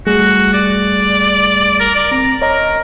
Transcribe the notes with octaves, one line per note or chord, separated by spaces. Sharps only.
G3 A3 F#4 G#4
D5
A#4
D5
C4 A#5
A#4 C#5 D#5 A#5